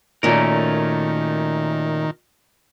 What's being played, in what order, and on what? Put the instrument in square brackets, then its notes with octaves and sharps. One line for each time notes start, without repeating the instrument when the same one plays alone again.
[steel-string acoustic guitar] F#2 A#2 [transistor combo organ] D#3 [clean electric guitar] A3 C#4 A#4